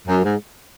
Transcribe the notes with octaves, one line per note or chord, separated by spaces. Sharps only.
F#2
G#2